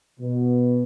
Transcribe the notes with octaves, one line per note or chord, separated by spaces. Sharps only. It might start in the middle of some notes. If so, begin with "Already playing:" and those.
B2